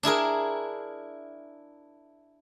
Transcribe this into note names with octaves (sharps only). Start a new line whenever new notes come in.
D4 E4 G#4 A#4